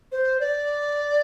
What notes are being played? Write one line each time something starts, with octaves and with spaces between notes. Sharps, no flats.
C5
D5